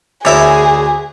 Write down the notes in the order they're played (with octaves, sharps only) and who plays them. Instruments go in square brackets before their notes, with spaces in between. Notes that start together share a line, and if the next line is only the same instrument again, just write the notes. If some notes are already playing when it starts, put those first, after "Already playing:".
[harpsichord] D2 E4 A#4 [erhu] G#4 [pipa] C#5 E5